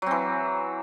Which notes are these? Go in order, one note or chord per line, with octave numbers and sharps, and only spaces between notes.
E3 F#3 C4